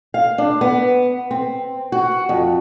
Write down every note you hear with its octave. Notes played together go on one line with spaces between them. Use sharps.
F5
D4
B3
C4
F#4
F2